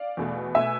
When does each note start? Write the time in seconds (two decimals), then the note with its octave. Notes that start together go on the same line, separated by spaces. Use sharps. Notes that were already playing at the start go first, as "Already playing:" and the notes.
Already playing: D5 F5
0.17 E2 B2 A3
0.55 B2 A3 E5 G#5